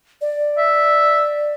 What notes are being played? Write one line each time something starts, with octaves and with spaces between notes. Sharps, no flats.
D5
E5